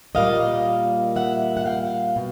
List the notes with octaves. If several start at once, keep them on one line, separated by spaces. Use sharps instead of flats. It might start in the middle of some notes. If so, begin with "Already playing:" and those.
A#2 G3 A#3 D#5 F5
E5 F#5
F#5
F5 G5
B2